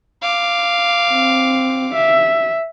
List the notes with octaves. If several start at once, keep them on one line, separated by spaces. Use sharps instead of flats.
F5 D6
C4
E5